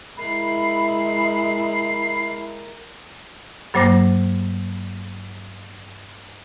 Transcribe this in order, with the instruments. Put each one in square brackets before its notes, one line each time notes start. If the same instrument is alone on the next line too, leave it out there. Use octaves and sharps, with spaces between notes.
[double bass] G#3 E4 [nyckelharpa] A#4 [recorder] B5 [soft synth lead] C7
[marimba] G2 F#3 A#3 C5 D6 A#6